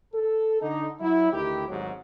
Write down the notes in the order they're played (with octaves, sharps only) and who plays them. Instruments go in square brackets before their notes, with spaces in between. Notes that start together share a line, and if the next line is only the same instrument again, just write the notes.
[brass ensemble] A4
D3 D#4
F#3 E4
D2 D#3 E4 G4
G#1 D2 G#2 F#3